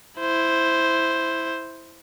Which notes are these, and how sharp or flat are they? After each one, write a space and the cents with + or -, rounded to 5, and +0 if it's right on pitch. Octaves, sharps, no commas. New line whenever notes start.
E4 +0 C5 +0